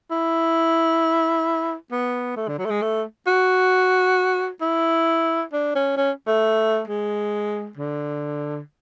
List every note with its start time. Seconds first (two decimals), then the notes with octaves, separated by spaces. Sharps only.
0.11 E4
1.91 B3
2.36 A3
2.48 D3
2.58 F#3
2.65 A3
2.70 G#3
2.82 A3
3.26 F#4
4.61 E4
5.53 D4
5.75 C#4
5.97 C#4
6.27 A3
6.87 G#3
7.77 D3